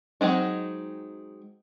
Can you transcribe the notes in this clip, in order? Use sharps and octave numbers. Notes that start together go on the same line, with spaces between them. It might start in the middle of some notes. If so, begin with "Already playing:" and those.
F#3 G#3 C4 D#4